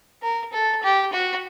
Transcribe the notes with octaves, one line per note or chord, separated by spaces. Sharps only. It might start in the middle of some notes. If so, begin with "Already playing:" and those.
A#4
A4
G4
F#4